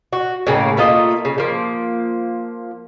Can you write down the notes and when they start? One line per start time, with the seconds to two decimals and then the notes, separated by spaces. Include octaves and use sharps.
0.13 F#4
0.47 A2 C#3 A#3
0.77 A3 A#3 F4 D#5
1.25 C#3
1.38 F3 A#3